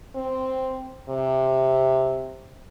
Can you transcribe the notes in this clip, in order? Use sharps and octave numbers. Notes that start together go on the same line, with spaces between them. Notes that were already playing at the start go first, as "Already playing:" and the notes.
C4
C3